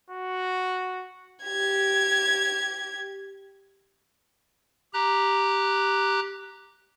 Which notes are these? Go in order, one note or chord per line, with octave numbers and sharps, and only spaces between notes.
F#4
G4 G#6
G4 A#5 F#6